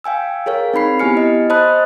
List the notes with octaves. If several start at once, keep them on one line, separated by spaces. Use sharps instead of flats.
F5 G5 G#5 E6
G#4 A#4 C#5 F5
C4 D#4 B5 C7
B3 E4 G4 G#5 F6 C#7
D#5
C5 D#5 A5 B5 D#6 F#6